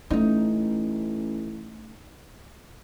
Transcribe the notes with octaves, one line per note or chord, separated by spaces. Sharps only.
A1 A3 C#4 D#4